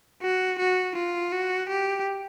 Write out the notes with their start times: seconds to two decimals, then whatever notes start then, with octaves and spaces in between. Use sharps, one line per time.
0.22 F#4
0.58 F#4
0.96 F4
1.32 F#4
1.69 G4